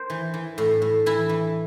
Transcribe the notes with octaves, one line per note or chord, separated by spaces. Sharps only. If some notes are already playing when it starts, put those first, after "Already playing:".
Already playing: A#4 C5
E3
E3
A2
A2
E3 E4
E3